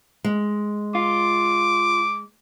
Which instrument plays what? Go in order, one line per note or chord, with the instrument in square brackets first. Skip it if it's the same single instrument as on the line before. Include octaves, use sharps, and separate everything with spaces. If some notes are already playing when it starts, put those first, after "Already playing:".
[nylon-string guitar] G#3
[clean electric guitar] F4 [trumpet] D6